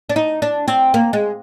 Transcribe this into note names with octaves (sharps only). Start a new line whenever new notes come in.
D4
D#4
D4
C4
A#3
G#3